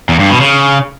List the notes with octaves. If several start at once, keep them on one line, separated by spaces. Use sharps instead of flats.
E2
G2
B2
C#3